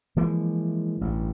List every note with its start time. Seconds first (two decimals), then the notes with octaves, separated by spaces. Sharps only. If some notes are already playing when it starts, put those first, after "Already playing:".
0.16 E3 F3 G#3 A#3
1.01 A1 G2